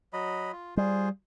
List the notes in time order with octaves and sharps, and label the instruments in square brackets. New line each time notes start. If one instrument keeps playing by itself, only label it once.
[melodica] F#3 D#5 B5
F4
[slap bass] G3 [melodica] F4 G#4 C5